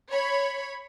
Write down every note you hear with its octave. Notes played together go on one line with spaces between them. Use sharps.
C#5 B5